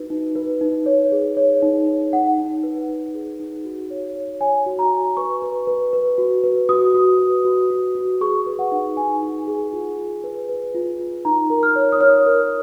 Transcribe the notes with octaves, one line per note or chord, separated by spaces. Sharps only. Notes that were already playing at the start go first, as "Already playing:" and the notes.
Already playing: D#4 F#4 B4
D#4
B4
D#4
C#5
G#4
C#5
D#4
C#5
D#4 F#5
D#4
B4
D#4
G#4
D#4
F#4
C#5
C#5
C#5 G#5
F#4
A#5
F#4
B4 C#6
B4
B4
B4
F#4
B4
F#4 D#6
F#4
B4
F#4
F#4
F#4
G#4 C#6
B4
F#5
D#4
D#4 G#5
D#4
G#4
F4
F4
B4
B4
F4
F4
D#4 A#5
A#4
F6
C#5
D#6
C#5 F6
A#4